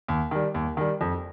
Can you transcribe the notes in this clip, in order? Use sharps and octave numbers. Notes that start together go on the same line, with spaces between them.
D#2
D#3 G3
D#2
D#3 G3
F2